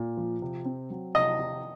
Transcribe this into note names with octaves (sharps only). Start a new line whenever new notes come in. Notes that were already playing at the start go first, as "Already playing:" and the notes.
Already playing: A#2
F3
C3
C4
F#3
C3 D#5
C3